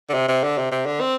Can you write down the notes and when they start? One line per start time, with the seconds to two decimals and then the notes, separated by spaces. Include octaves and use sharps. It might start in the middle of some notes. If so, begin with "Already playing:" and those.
0.09 D3
0.14 C3
0.29 C3
0.44 D3
0.58 C3
0.72 C3
0.86 D3
1.01 C4